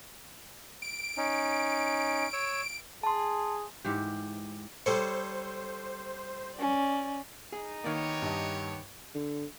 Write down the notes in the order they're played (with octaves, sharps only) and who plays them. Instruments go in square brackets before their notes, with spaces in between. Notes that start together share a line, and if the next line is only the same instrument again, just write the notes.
[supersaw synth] D7
[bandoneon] C#4 D#4
C#5 E6
[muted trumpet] G#4 [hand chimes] A5 C6
[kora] G#2 E3 G4
[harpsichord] G3 A4 C#5 [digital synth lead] C5
[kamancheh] C#4 D5
[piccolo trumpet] D#4 [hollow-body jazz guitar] G#4
[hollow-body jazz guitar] D#3 A#3 [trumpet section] B3 G4 C#5
[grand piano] G2 D#5
[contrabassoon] D3